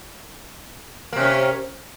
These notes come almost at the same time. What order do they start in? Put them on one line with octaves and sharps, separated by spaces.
A#3 C3 C#4